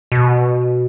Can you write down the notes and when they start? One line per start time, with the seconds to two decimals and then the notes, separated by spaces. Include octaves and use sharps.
0.12 B2